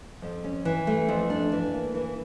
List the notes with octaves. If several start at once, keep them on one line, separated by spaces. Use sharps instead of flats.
F2
C#4
E3
A3
F2
D4
E3
A#3
E3